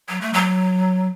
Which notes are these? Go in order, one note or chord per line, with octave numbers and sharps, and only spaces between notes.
F#3
A3
F#3